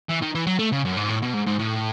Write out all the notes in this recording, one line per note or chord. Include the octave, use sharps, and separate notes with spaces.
E3
D#3
E3
F#3
A3
C#3
F#2
G#2
A2
B2
G#2
G#2
A2